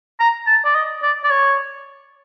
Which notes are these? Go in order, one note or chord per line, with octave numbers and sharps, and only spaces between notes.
A#5
A5
D5
D#5
D5
D5
C#5